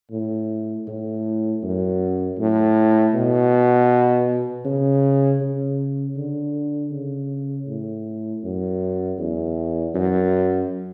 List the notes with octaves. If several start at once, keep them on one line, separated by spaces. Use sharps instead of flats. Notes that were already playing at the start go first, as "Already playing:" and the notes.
A2
A2
F#2
A2
B2
C#3
C#3
D3
C#3
A2
F#2
E2
F#2